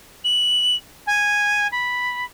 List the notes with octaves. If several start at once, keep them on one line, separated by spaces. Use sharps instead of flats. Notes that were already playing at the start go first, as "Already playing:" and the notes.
F#7
G#5
B5